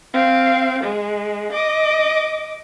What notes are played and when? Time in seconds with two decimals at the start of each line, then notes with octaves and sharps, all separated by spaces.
0.14 C4 F5
0.84 G#3
1.52 D#5 D6